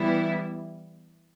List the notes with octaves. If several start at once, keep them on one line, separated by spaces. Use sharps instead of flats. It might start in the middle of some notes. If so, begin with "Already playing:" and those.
Already playing: E3 G3 B3 E4